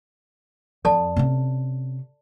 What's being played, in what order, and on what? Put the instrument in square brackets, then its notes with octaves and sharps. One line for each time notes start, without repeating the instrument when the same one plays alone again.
[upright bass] F2 [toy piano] A4 D5 A5
[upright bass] C3 C#4